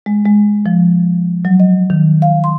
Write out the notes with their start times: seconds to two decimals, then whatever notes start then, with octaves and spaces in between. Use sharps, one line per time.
0.06 G#3
0.25 G#3
0.66 F3
1.45 F#3
1.60 D#5
1.90 D#3
2.22 F5
2.44 C6